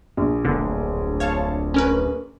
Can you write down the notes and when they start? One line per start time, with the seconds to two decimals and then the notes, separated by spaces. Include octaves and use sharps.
0.17 A#1
0.45 D1 D2 D3 A#3
1.20 C#5 F5 A5
1.74 C#4 A#4 B4